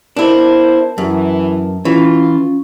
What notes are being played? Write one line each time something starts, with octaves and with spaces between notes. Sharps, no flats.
B3 D4 E4 A#4 C5 A5
F#2 E3
E3 C#4 F4